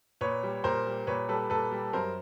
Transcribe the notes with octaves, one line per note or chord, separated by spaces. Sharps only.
A#2 B4 C#5
G3
A#2 A#4 C5
G3
A#2 B4 C#5
G3 A4 B4
A#2 A4 B4
G3
F#2 A#4 C5